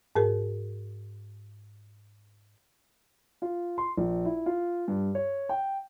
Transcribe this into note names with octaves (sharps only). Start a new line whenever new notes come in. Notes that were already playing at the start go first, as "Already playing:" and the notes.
G#2 G#4 A#4
F4
C6
A#1
E4
F4
G2
C#5
G5